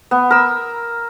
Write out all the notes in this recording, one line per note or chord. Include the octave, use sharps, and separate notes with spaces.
B3
A#4 E6